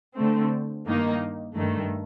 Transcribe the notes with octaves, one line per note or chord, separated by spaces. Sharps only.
D3 A3 C4
G2 D#3 A#3 D#4
G2 D#3 A3